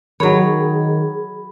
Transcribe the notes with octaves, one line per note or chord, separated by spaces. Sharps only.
D#3 F#3 G#4 C#5 B5